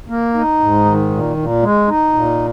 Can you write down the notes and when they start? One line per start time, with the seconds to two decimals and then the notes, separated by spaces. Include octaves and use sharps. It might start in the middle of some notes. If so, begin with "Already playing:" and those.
0.09 A#3
0.34 D#4
0.60 G#2
0.85 D#3
1.10 A#2
1.37 A#2
1.62 G#3
1.88 D#4
2.13 A#2